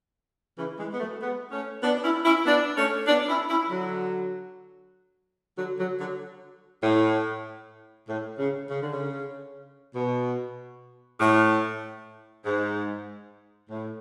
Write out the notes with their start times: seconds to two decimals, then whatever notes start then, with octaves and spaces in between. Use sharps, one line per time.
0.58 C#3 E3
0.79 E3 G#3
0.93 B3
1.00 F#3 A3
1.21 G#3 B3
1.52 A3 C#4
1.83 B3 D4
2.04 C#4 E4
2.25 C#4 E4
2.45 B3 D4
2.77 A3 C#4
3.08 B3 D4
3.29 C#4 E4
3.49 C#4 E4
3.71 D3 F#3
5.58 D3 F#3
5.78 D3 F#3
6.00 D3 F#3
6.83 A2
8.08 A2
8.39 C#3
8.70 C#3
8.82 D3
8.92 C#3
9.95 B2
11.20 A2
12.45 G#2
13.70 A2